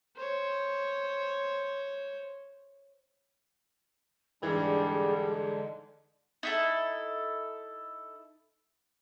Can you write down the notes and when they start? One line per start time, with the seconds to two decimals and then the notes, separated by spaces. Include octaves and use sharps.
0.17 C5 C#5
4.43 G#2 D3 E3 G3 G#3 D4 G#4
6.43 D#4 E4 A4